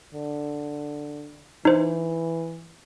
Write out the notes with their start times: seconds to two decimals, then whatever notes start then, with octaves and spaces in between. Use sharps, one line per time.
0.14 D3
1.65 E3 D#4 C5